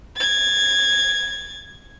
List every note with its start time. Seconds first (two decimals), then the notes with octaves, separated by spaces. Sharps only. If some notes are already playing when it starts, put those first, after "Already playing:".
0.17 G#6 A6